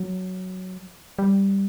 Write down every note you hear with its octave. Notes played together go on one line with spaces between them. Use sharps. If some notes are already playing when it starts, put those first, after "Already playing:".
Already playing: F#3
G3